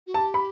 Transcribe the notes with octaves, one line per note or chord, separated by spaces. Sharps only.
F#4
G4 A5
B5